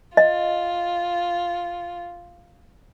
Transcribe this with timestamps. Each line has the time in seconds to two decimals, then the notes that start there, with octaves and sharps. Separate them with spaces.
0.17 F4 D#5